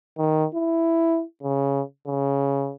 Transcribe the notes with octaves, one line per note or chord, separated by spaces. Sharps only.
D#3
E4
C#3
C#3